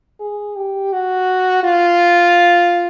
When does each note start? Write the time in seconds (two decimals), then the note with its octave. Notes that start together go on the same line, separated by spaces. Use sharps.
0.20 G#4
0.56 G4
0.92 F#4
1.63 F4